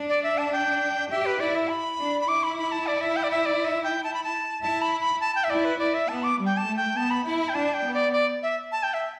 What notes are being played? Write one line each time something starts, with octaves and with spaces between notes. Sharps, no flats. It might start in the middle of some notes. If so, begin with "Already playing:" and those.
Already playing: D4
D5
E5
A5
G5
G4 E5
B4
E4 D5
E5
B5
D4
B5
E4 D6
B5
B5
A5
D5
E5
G5
D5
E5
D5
E5
G5
A5
B5
A5
E4 A5
B5
B5
A5
G5
E5
E4 D5
B4
E4 D5
E5
B3 A5
D6
G3
G5
A5
A3
G5
B3 A5
B5
E4 B5
B5
G5
D4 A5
G5
B3
D5
D5
E5
A5
G5
E5